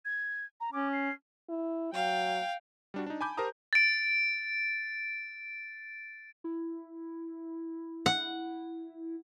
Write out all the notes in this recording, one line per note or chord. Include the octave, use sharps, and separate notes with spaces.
G#6
A#5
C#4 D6
C7
E4
F#3 F5 G5
G3 D4 F#4
D4 D#4
G#5 A5 B5 D6 G6
G4 A#4 C5 A5 A#5 D#6
A6 D7
E4
F#5